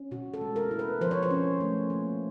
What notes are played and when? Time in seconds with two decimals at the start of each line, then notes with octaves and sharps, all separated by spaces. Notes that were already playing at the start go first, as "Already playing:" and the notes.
Already playing: C#4
0.11 B2 F#4
0.34 A4
0.41 G#3
0.56 A#4
0.71 E4
0.79 B4
1.01 F3 C5
1.11 C#5
1.23 C5
1.31 C#4
1.61 A3
1.90 A#3